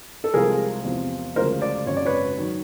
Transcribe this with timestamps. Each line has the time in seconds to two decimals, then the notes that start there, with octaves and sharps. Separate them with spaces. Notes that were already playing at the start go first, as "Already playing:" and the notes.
0.24 A4
0.34 C2 C3 F3 G#3 G#4 A#4
0.84 E2 C3 F3
1.35 D2 C#3 F3 G#3 A#4 C5
1.61 C5 D5
1.86 G#1 F#2 C#3 C#5
1.97 D5
2.06 B4 C#5
2.37 D#3 F#3